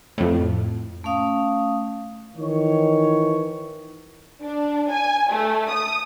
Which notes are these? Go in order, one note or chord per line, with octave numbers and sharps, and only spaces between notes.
F2 A2
A3 C#4 F5 D#6
D#3 E3 C#5
D4
G#5
A3
D#6